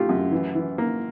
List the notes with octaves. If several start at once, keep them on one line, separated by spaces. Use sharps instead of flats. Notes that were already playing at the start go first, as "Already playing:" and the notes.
Already playing: A3 F4 G4
F#2
E3
E3
A#3